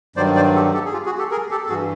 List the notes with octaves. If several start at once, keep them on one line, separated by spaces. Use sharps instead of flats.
G2 D#3 F#3 C5 D5
C5 D5
G4 A4
G4 A4
G#4
F4 G4
F#4 G#4
G4 A4
G#4 A#4
G4 A4
A4
G2 E3 F#4 G#4